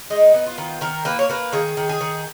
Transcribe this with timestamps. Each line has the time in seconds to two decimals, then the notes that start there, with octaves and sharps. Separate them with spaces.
0.10 G#3 D#4
0.34 B3
0.47 F4
0.58 D#3
0.81 D#3 A#4
1.05 A#3 B4
1.19 C#5
1.30 A#3 B4
1.52 D#3 G#4
1.77 D#3
1.89 G#4
2.01 D#3